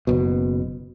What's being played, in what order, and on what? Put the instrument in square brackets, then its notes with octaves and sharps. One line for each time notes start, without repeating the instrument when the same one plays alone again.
[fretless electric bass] F#1 B2